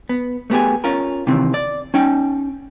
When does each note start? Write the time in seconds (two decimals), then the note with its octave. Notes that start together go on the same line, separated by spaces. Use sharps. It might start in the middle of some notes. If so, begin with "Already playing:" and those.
0.09 B3
0.50 A3 B3 G4 G#4
0.84 C#4 F4 A#4
1.27 C3 D#3 E3 C4
1.54 D5
1.94 C#4 D#4 G5